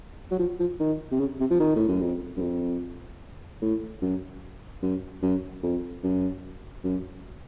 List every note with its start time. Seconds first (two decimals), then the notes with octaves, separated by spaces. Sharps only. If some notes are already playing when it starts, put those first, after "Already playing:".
0.31 F#3
0.39 F3
0.60 F3
0.80 D#3
1.12 C3
1.20 C#3
1.40 C3
1.50 F3
1.60 D#3
1.76 A2
1.89 F#2
2.01 F2
2.37 F#2
2.41 F2
3.62 A2
4.02 F#2
4.83 F#2
5.23 F#2
5.63 F2
6.04 F#2
6.84 F#2